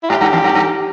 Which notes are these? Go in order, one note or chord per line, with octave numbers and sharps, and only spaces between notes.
E4
G#2 G4
G2
E2
G2
G2